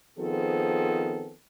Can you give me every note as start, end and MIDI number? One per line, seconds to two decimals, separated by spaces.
0.18 1.32 51
0.18 1.32 53
0.18 1.32 59
0.18 1.32 60
0.18 1.32 68
0.18 1.32 69